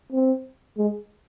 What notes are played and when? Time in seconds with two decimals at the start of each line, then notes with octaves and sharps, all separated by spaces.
0.12 C4
0.78 G#3